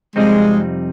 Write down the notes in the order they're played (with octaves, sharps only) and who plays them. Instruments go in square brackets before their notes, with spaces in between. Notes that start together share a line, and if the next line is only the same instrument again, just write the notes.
[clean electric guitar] F2 C3 G3 C4 D#4 [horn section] G#3